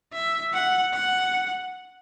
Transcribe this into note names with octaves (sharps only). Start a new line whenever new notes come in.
E5
F#5
F#5